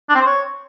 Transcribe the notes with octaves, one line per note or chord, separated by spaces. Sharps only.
D4
C4
C5
C#5